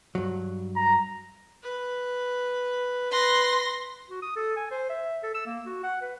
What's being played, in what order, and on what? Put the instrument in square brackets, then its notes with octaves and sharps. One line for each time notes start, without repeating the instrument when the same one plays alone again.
[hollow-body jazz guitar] G2 F#3
[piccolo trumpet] A#5
[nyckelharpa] B4
[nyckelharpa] B4 [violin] C6 A#6
[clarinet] F#4
D#6
A4
G#5
C5
E5
A4
E6
A#3
F#4
F#5
B4